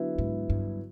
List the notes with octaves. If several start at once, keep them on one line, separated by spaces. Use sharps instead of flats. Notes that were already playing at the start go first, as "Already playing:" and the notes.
Already playing: D3 F#3 B3 E4
G#2
G2